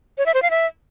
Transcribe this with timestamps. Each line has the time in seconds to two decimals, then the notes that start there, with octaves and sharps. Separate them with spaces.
0.18 C#5
0.26 E5
0.34 C5
0.42 F5
0.51 E5